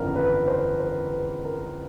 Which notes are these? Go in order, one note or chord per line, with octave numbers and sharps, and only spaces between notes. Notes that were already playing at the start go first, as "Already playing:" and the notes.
Already playing: G1 F2 C#3 E3 A#4
B4
C5
C5
B4
A#4